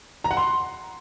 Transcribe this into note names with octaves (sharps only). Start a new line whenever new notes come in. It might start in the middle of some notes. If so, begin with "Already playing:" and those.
A#5
F#5
C6